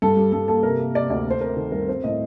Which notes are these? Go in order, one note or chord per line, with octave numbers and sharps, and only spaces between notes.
G2 A4
G3
G2 A4
A#3 A4
C3 A#4
A#3
C3 D5
D2 D5
A3 C5
C4 A#4
D#3 A4
G2 A#4
C4 C5
A2 D#5